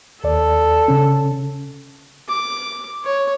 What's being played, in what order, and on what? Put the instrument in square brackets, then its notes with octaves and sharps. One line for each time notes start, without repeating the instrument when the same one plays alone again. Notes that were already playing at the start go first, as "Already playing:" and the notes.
[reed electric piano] D#2 D5 [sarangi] A4
[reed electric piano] C#3 C#4
[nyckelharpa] D6
C#5